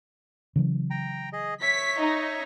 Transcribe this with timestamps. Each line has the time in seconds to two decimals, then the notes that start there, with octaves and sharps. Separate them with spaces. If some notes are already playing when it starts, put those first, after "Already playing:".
0.56 C#3 E3 F#3
0.91 G5 A#5
1.33 G#4 D#5
1.62 C#5 E5 C#6 B6
1.99 D#4